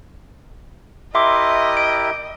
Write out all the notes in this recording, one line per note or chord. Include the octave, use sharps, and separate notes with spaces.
E4 G4 A#4 D#5 E5 C6 D6
D7